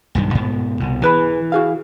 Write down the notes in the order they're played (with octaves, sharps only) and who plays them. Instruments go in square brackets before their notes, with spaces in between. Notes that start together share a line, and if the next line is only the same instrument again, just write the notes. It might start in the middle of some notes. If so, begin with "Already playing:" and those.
[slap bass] B1 G2 D#3
G#2 B2 B3
C2 B2
[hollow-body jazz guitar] E2 B4 B5 [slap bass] E3
[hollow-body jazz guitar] F#4 G#4 F5